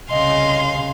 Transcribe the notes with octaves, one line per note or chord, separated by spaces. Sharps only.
C2 C#3 D#5 F5 G#5 C6